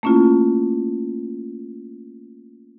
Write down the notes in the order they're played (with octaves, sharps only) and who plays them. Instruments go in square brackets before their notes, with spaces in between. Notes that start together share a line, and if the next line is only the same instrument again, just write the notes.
[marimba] A3 A#3 C#4 E4 F4